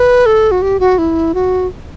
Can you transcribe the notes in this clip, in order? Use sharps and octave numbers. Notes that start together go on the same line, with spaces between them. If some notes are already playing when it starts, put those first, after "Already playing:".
Already playing: B4
A4
F#4
G4
F#4
E4
F#4